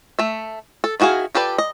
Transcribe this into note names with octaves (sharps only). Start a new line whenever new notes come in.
A3 E5
A4
D#3 E4 F#4 G#4 F5
F4 G4 A4 B4 D5
D#5